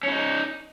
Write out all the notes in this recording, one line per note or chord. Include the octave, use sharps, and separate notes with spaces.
C#4 D#4 E4